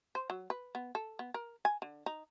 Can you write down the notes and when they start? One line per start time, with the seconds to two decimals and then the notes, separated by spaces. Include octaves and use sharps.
0.15 C5
0.30 F#3
0.50 B4
0.75 B3
0.95 A4
1.19 B3
1.34 A#4
1.65 G#5
1.82 D3
2.06 D#4